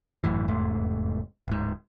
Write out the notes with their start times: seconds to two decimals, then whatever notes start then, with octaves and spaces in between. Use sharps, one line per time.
0.24 G#1 F#2 A2 E3
0.48 F1 E2 G#2 A3
1.48 D1 G#2